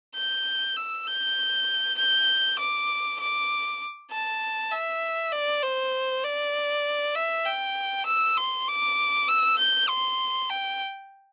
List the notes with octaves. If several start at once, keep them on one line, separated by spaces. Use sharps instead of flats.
G6
E6
G6
G6
D6
D6
A5
E5
D5
C5
D5
E5
G5
E6
C6
D6
E6
G6
C6
G5